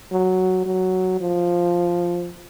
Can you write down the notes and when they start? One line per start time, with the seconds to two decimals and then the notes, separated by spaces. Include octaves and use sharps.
0.11 F#3
0.66 F#3
1.20 F3